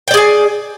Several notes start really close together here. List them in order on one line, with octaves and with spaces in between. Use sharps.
G5 D5 G#4 G#5